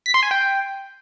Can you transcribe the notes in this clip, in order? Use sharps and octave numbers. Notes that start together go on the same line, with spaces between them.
B6
C6
G#5
G5